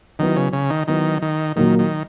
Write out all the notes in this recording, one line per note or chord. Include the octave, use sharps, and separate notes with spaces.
D#3 F#3 B3 E4
C#3
C#3
D#3
D#3 F#3 B3 E4
D#3
A#2 D#3 F#3 A#3
D#3